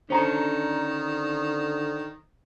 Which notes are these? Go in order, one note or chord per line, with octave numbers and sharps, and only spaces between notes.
D3 D#3 C#4 D4 A4 C5 A#5